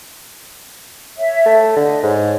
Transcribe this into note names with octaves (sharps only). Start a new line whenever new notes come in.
C#5 E5
A3
D3 D#5
G#2 C#5